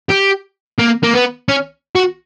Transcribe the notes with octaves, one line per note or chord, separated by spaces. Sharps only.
G4
A#3
A#3
B3
C#4
F#4